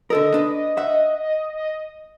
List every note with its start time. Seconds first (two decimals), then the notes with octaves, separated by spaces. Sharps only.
0.10 D3 A4 A#4 D#5
0.34 D4 B4
0.77 E5 F#5